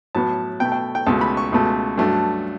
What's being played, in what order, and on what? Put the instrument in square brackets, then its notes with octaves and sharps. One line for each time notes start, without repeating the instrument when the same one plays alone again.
[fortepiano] A2 F#3 B3 A5
B2 A3 G5
G5
G5
C#2 B2 A3 A5
B5
C#6
C#2 B2 A3
G2 F#3 A3